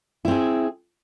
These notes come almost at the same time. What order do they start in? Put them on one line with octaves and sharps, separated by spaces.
E4 C4 G#4